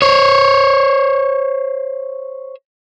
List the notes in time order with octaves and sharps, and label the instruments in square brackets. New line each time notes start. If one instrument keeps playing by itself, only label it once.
[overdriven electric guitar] C5 C#5